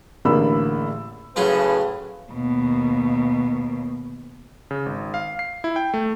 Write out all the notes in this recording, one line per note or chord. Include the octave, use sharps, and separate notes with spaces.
A1 D3 A#3 G#4 B5 E6
A2 C#3 F#3 F4 G#4 B4
D#2 B2
C#3
G#1
F5
C7
E4
G5
A3